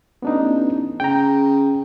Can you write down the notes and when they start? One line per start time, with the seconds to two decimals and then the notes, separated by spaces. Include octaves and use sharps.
0.22 A1 B3 D4 D#4
1.00 C#3 G5 A#5